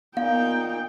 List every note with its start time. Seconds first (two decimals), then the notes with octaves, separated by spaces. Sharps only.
0.17 A#2 B3 D#4 F5 G5